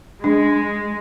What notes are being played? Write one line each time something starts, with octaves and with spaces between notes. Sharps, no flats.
G#3 D4